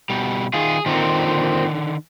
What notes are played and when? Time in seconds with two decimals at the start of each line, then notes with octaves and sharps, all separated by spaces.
0.10 B2 G3
0.54 D#3 F4 G#4
0.86 A#2 D3 D#3 C4